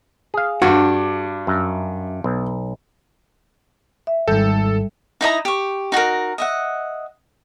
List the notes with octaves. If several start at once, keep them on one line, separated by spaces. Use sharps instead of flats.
G#4 F5
G2 D4 F#4
F#2
B1
E5
G#1 G#2 G3 A4 G6
D#4 E4 D#5 A#5
G4 C#6
D#4 F#4 G#4 A#4
D#5 E5 F#5